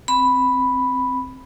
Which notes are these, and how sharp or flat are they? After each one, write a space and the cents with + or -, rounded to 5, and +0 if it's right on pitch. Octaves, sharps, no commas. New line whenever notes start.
C4 +0 B5 +0